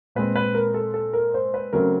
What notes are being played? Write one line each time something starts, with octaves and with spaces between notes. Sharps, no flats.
A#2 F3 G#3 C4 B4
B4
A#4
A4
A4
A#4
C5
B4
C#3 F#3 A3 C4 A#4